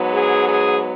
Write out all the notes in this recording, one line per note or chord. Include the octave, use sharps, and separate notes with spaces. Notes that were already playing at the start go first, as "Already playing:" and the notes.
Already playing: G#2 F#3 B3
G#4
G#4